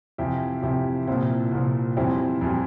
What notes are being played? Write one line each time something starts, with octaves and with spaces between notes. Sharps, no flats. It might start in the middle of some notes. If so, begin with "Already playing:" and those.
F2 C3 E3 E4 G4
F2 C3 E3 E4 G4
C2 A#2 F3 C4 E4
C2 A#2 F3
F2 E3 G3 C4 E4
F2 E3 G3